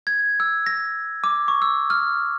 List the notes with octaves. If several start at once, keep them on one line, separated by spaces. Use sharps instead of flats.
G#6
E6
A#6
D6
C#6
E6
F6